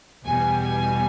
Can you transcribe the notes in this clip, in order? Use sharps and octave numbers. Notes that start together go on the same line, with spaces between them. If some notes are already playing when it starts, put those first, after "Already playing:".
E2 B2 G3 G#5
G#5